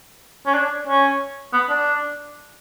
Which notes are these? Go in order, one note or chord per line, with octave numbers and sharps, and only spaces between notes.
C#4
D4
C#4
B3
D4